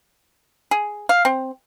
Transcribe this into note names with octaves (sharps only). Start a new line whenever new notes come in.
G#4
F5
C4